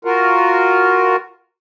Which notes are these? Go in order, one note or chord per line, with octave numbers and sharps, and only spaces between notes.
F4 F#4 A#4